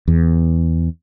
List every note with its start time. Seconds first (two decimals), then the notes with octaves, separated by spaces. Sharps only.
0.08 E2